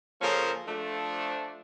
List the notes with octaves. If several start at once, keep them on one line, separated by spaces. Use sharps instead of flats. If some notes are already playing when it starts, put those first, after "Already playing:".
C#3 F3 A#3 C#4 A4 A#4
F3 A3 D4